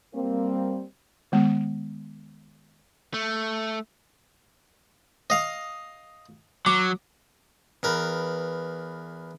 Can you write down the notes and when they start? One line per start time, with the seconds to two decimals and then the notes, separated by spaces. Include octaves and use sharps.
0.14 G3 A#3 C4
1.32 D#3 G#3 B3
3.14 A3
5.30 D#5 F5
6.66 F#3 D6
7.83 E2 A#4 B4